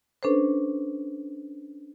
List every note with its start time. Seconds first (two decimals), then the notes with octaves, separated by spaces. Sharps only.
0.23 C#4 D4 A4 B4 C5